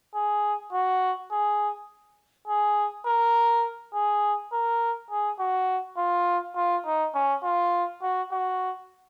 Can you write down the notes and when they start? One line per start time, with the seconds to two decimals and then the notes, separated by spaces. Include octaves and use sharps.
0.15 G#4
0.73 F#4
1.31 G#4
2.48 G#4
3.06 A#4
3.94 G#4
4.52 A#4
5.11 G#4
5.40 F#4
5.97 F4
6.56 F4
6.86 D#4
7.15 C#4
7.44 F4
8.02 F#4
8.32 F#4